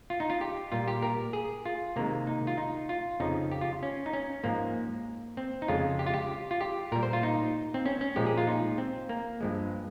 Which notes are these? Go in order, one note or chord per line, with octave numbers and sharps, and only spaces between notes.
F4
D#4
F4
G4
A#2 G3 F4
G4
A#4
G#4
F4
C3 D#3 G#3 A#3
D#4
F4
D#4
F4
F2 C#3 F3 D#4
G4
F4
C#4
D#4
C#4
G#2 F3 G#3 A#3
C4
D#4
F2 C#3 G#3 F4
G4
F4
G4
F4
G4
A#2 G3 A#4
C5
F4
D#4
C4
C#4
C#4
A#2 F3 G#3 G4
G#4
F4
D#4
C4
A#3
G2 F3 G#3